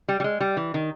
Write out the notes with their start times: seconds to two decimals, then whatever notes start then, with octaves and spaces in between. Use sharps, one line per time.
0.08 G3
0.20 G3
0.24 G#3
0.40 G3
0.57 E3
0.74 D#3